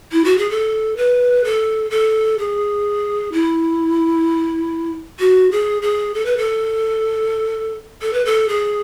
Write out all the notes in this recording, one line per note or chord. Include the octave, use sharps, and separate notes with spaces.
E4
F#4
G#4
A4
B4
A4
A4
G#4
E4
F#4
G#4
G#4
A4
B4
A4
A4
B4
A4
G#4